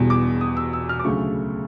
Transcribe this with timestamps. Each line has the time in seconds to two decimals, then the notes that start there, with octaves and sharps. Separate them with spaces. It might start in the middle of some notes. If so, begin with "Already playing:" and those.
Already playing: E1 E2 B2 G3
0.10 D6
0.41 D#6
0.57 E6
0.73 E6
0.89 F6
1.00 D6
1.04 D2 C#3 F#3 A3 C#6